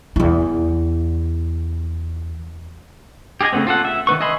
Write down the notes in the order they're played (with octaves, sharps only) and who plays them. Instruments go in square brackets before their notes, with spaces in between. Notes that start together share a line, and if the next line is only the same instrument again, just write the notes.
[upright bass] E2 E4
[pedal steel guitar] G4 G#4 A#4 D#5 G#5
C#3 F#3 A3 B3 C4
F4 A4 F#5
E5
D#3 C4 B4 C#6
D#5 E5 G#5 B5 C6